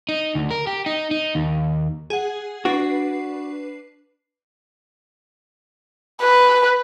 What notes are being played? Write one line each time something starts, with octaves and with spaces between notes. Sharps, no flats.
D#4
D2
A#4
G4
D#4
D#4
D#2
G#4 F#5
D4 F#4 B4 C7
B4